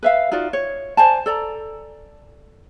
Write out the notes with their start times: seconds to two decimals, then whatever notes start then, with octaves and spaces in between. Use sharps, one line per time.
0.03 B4 E5 F5
0.32 D#4 F4 F#4 D5
0.53 C#5
0.97 C5 D5 G#5 A5
1.26 A4 D5 A#5